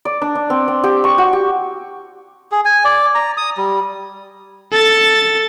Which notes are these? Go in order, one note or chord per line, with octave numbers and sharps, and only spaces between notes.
D5
D4
D4
C4
C4
G4
C#6
F#4
G4
G#4
G#5
D5
A#5
D#6
G3
A4 A6